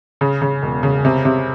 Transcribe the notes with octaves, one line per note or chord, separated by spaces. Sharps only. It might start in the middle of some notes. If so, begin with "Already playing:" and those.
C#3
C#3
E1
C#3
C3
C3